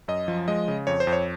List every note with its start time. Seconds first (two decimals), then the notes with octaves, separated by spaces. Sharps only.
0.08 F#2 D#5
0.28 F3
0.48 G#3 D#5
0.68 C#3
0.87 F2 C#5
1.00 C5
1.07 F2
1.13 C#5